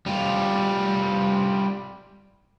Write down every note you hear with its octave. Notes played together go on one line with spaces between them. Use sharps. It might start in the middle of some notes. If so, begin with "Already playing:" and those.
G3 F4